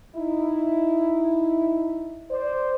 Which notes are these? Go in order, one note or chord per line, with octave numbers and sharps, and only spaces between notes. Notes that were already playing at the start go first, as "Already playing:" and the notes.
D#4 E4
C5 D5